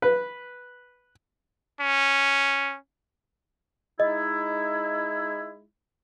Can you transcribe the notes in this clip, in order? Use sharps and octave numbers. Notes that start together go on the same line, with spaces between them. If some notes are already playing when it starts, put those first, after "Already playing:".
B4
C#4
G#3 D#4 E4 D#5